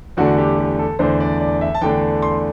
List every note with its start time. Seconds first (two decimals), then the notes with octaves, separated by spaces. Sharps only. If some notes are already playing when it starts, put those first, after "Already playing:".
0.17 E2 D3 A3 D4 F#4
0.38 G4
0.59 G4
0.79 A4
0.99 E2 D3 A3 D4 C5
1.20 D5
1.40 D5
1.61 E5
1.75 A5
1.81 E2 D3 A3 D4 G5
2.22 C6